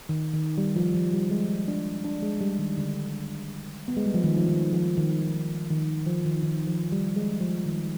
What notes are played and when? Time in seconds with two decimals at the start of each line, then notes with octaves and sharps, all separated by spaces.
0.09 D#3
0.34 D#3
0.58 G3
0.76 F3
0.94 F3
1.13 G3
1.31 G#3
1.68 D4
2.04 D4
2.22 G#3
2.41 G3
2.59 D#3
2.77 D3
3.88 B3
3.97 G#3
4.06 G3
4.14 F3
4.23 D#3
4.37 F3
4.48 D#3
4.73 F3
4.97 D#3
5.70 D#3
6.07 F3
6.25 D#3
6.43 D#3
6.67 F3
6.92 G3
7.16 G#3
7.40 F3
7.65 D#3